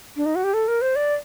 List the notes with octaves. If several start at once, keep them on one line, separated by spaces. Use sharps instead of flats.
D4
D#4
F#4
G4
A4
A#4
C5
D5